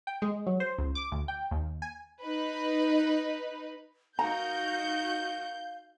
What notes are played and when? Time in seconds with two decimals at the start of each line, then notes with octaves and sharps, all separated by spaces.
0.07 G5
0.22 G#3
0.47 F#3
0.60 C5
0.78 C#2
0.95 D6
1.12 D2
1.28 G5
1.51 D#2
1.82 G#5
2.20 D#4 B4
4.19 D#4 F#4 A#4 F5 A#5 G6